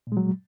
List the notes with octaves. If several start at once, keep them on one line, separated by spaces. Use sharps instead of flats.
A#2 F#3 G#3